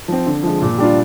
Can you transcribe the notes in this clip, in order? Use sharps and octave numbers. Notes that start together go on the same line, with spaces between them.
F3 C4
D3
F3 G#3
A#2
G3 D4 F4